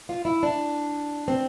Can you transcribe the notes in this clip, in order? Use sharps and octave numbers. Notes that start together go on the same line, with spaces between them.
F4
E4
D4
C4